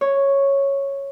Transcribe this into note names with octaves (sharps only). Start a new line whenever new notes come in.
C#5